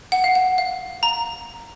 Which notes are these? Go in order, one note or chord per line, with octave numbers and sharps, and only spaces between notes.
F#5
F5
F#5
F5
A#5